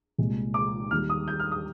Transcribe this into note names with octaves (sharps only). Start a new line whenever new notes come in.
C2 A#2 G#3
D6
D#2 D#3 G3 F6
D#6
G6
F6
D#6